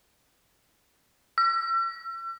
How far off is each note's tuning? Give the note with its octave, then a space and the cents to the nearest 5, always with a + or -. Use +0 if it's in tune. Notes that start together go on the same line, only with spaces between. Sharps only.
E6 +40